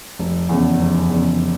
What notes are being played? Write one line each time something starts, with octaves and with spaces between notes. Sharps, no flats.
F1
E2 C#3
F1
E2
C#3